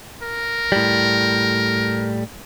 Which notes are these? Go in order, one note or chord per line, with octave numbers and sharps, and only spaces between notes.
A#4
A2 G3